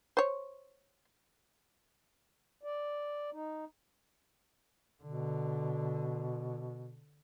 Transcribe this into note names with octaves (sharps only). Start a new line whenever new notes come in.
C5 C#5
D5
D#4
B2 D3